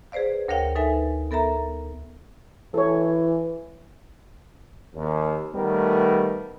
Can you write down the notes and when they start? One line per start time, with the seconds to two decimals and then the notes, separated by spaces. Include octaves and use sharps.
0.12 G#4 B4 C5 D5 F5
0.48 D2 A#4 C#5 F5 G5
0.75 D#4 A4 B4 E5 G#5
1.31 B3 A4 A#4 E5 A#5
2.74 E3 A4 C#5
4.95 D#2
5.54 D#3 G3 A3 B3 A#4